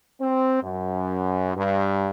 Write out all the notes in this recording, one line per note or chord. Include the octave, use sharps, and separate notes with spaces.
C4
F#2
G2